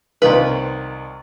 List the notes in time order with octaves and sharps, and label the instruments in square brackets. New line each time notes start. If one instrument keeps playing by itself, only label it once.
[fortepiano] C2 D#3 F4 [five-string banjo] B4